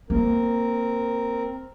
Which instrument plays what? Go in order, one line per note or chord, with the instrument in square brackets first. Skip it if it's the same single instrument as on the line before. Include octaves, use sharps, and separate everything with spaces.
[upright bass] A#3 [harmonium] C4 A#4